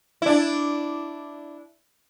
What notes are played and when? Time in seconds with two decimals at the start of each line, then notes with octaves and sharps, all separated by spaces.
0.22 D4 E4